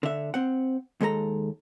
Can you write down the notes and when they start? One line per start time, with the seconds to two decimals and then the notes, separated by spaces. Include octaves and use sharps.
0.03 D3 E5
0.34 C4 F#5
1.01 D#2 G#3 A4 A#5